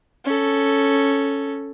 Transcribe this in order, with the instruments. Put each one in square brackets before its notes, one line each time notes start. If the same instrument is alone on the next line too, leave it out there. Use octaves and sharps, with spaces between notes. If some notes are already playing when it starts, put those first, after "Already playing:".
[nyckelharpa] C#4 A4